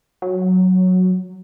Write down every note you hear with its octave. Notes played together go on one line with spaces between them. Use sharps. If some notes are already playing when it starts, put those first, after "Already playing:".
F#3